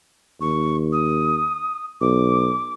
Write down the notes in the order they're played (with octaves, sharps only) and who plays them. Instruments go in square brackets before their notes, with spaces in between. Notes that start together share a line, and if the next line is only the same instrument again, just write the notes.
[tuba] D#2 [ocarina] C#6
[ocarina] D#6
[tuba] B1 [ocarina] D6